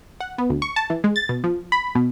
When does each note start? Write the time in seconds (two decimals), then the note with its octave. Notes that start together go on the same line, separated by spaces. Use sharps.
0.20 F#5
0.38 B3
0.50 D2
0.62 C#6
0.76 A5
0.90 E3
1.04 G#3
1.16 A6
1.29 B2
1.44 F3
1.72 B5
1.95 B2